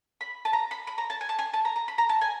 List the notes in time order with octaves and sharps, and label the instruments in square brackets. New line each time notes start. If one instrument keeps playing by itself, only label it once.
[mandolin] B5
A5
A#5
B5
B5
A#5
A5
G#5
A5
G#5
A5
A#5
A#5
B5
A#5
A5
G#5